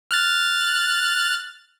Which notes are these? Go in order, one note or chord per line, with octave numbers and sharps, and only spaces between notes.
F6 F#6 A6